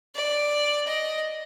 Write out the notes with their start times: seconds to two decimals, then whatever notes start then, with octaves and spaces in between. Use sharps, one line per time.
0.16 D5
0.87 D#5